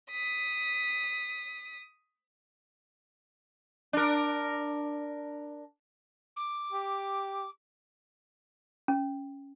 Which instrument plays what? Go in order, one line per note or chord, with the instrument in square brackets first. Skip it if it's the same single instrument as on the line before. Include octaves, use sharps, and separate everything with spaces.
[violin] D#6 B6
[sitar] D4 A#4
[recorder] D6
[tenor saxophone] G4
[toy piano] C#4